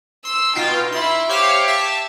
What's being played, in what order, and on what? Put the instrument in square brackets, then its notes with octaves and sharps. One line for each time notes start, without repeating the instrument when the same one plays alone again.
[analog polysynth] C6 [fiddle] E6
[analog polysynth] B2 F4 G5 [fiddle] D#4
[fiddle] E4 E5 [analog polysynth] C6
[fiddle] G4 [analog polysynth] C5 C#5 F5
[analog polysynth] E5 A5